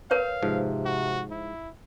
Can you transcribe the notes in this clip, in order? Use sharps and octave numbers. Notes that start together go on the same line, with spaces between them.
A#4 B4 C#5 F5
G#2 C3 F3
F#4
E4